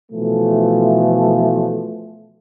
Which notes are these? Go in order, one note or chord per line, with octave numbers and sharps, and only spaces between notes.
B2 E3 F3 A3